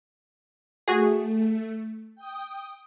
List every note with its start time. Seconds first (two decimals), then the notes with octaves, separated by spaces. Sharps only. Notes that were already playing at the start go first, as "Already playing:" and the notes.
0.88 A3 F#4 G#4
2.15 G5 D#6